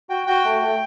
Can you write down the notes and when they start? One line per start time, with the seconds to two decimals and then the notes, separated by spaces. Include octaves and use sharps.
0.09 F#4 G5
0.27 F#4 G5
0.44 A3
0.62 A3